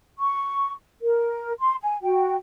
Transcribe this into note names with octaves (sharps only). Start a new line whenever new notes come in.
C#6
A#4
C6
G#5
F#4 G5